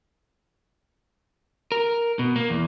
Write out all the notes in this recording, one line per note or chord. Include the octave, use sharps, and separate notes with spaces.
A#4
B2
A#3
E2